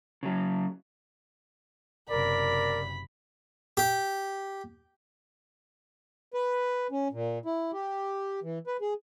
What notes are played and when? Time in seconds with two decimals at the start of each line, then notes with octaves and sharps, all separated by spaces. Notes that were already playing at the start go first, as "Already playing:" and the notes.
0.23 C#3 F#3
2.10 F#1 C3 A#4 D5 B5
3.77 G4
6.34 B4
6.91 C#4
7.12 A#2
7.45 E4
7.73 G4
8.43 E3
8.67 B4
8.81 G#4